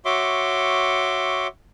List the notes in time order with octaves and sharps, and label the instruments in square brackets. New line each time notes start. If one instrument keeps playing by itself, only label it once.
[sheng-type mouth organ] F#4 C#5 E5 C6 D6